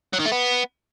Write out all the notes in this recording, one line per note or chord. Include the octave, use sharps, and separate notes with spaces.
F#3
D#3
A3
B3